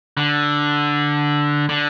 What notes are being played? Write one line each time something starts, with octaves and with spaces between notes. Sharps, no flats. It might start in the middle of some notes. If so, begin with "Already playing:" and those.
D3
D3